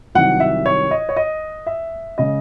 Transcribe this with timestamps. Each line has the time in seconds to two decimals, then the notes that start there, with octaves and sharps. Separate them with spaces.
0.15 C2 C3 D#3 F#3 F#5
0.40 E5
0.66 C#5
0.91 D#5
1.09 C#5
1.17 D#5
1.67 E5
2.18 C#3 G#3 D#5